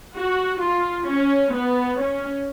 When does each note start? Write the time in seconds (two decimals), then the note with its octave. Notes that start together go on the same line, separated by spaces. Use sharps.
0.16 F#4
0.63 F4
1.08 C#4
1.55 B3
2.01 C#4